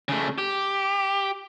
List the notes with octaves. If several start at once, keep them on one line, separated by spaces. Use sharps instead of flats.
C#3 A3
G4